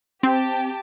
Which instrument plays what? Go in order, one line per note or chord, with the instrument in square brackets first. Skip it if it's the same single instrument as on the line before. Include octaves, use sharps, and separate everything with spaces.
[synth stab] C4 [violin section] G4 G5 A5